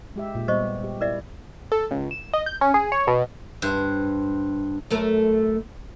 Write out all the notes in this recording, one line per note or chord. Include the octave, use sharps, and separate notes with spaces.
G#3 G4 E5
A#2
G3 B3 C5 D#5 C#6
G4
E4 A#4 D5 E5
A4
C#2
E7
D#5
G6
C#4
G#4
C#5
B2
G2 C5
F#2 A3 A#4